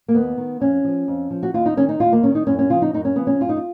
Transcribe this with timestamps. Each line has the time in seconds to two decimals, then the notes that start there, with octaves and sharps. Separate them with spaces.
0.08 A#3
0.14 D#2 B3
0.37 D#3
0.60 F2 C#4
0.84 F3
1.08 F2
1.30 F3
1.43 F#4
1.54 D#2 F4
1.66 D#4
1.77 D#3 C#4
1.89 D#4
2.00 D#2 F4
2.12 A#3
2.23 D#3 C#4
2.35 D#4
2.47 F#2 C#4
2.59 C#4
2.70 C#3 F3 F4
2.82 D#4
2.93 F#2 D#4
3.05 C#4
3.16 C#3 F3 B3
3.27 C#4
3.40 F#2 F4
3.49 D#4
3.57 F4